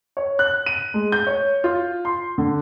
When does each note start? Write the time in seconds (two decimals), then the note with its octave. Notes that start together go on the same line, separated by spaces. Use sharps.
0.17 C#5
0.39 F#6
0.66 D#7
0.94 G#3
1.12 G6
1.27 C#5
1.64 F4
2.05 C6
2.38 D3